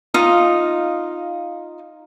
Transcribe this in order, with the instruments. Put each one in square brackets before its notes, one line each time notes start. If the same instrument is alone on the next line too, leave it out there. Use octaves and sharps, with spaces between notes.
[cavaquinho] D#4 F4 D#5 F5